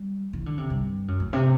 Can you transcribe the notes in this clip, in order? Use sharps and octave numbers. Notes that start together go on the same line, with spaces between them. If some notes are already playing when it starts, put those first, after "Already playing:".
Already playing: G3
E3
D3
C3
G2
F#2
A2
C3